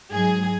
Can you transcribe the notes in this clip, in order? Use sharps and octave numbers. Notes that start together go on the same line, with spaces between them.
G#2 F#3 G#4